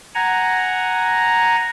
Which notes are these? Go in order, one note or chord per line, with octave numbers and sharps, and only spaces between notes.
F#5 G#5 A#5